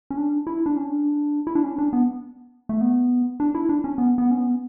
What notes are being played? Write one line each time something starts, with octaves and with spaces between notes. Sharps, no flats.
C#4
D4
E4
D4
C#4
D4
E4
D4
C#4
D4
B3
A3
B3
D4
E4
D4
C#4
B3
B3
C#4
B3